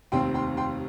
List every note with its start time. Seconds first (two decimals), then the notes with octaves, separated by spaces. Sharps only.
0.12 F1 D#2 D#3 C4 G5 C6
0.34 G5 C6
0.57 G5 C6